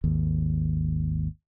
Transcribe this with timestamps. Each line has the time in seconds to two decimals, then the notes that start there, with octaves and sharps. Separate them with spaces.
0.04 G#1 D#2